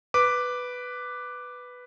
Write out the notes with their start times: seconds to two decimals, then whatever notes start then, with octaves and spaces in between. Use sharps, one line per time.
0.14 B4 D6